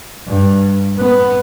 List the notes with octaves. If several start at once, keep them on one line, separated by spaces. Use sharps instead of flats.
G2
B3